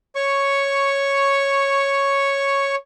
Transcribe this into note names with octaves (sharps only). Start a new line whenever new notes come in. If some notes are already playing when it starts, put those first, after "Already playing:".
C#5 C#6